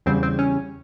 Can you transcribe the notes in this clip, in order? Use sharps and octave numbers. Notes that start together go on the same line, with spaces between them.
E2 C#3 G3 C4
C4
C#4